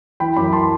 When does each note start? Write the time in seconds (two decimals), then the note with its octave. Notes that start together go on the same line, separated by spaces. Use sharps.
0.20 E3 G5 B5
0.37 F#2 B5 D6
0.53 A5 C6